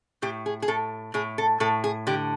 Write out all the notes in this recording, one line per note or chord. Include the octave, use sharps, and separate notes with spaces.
A2 G4
G#4
G#4
A2 A4
A2 G#4
A4
A2 A4
G#4
D3 G4